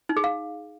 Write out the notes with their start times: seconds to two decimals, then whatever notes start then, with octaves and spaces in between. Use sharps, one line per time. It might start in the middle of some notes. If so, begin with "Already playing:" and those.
0.09 D#4
0.17 G#4
0.24 F5